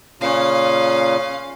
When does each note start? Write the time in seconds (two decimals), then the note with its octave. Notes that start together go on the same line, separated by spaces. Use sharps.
0.21 A#2 C#3 C#4 F5